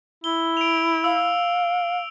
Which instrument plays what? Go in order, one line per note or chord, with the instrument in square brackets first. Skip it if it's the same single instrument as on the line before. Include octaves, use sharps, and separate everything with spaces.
[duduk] E4 [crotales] G7
[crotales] D7 F7
[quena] F5 [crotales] E6